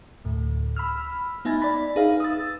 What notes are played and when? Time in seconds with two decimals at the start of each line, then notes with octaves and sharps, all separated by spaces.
0.25 D2 A2
0.76 B5 E6 F6
1.45 B3 D#4 E5 G#5 B5 A6
1.62 D5 B5
1.96 D#4 G#4 B4 E5 F5
2.20 D#6 E6 A6